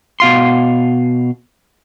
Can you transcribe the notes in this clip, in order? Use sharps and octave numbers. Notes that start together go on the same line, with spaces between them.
B2 F5 C6